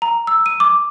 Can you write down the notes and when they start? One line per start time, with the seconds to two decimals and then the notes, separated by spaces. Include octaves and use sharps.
0.02 A#5
0.27 E6
0.46 D#7
0.60 D6